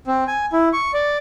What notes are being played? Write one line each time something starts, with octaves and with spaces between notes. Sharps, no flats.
C4
G#5
E4
C#6
D5